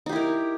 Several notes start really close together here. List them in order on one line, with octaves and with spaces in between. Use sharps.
D#4 G4 E4 A#4